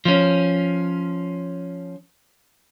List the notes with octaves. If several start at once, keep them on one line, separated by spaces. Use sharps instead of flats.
F3 C#4